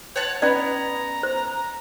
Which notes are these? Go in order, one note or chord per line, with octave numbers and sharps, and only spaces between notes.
C#5 F#5 A5
B3 C#4 D5 A#5
C5